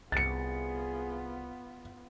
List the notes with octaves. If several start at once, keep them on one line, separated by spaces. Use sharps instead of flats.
C2 B3 F4 G#4 A6 C#7